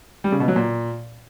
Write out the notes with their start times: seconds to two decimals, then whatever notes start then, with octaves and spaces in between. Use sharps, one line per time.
0.24 G3
0.32 C#3
0.40 B2
0.48 F#3
0.56 A#2